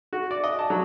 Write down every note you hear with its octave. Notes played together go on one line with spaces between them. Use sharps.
F#4
D5
D#5
A5
F#3